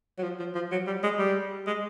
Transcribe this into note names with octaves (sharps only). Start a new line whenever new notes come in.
F#3
F3
F3
F3
F#3
G3
G#3
G3
G#3